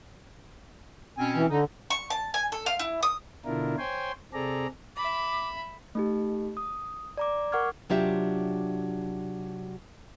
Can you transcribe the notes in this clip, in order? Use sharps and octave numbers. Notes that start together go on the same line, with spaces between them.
B2 C4 C#4 G#5
E3
D3 D#4
C#6
A5
G#5
A4
F5
E4
D#6
B2 D3 D4 E4 F4 A#4
C5 C#5 G5 G#5 C6
C3 C4 G#4 A4 D5 A#5
E5 B5 D6
A3 D#4 G4
D#6
D5 A#5 D6
A#4 F#5 C#6 D6 F6 G#6
C3 F#3 D4 F4 G4 E5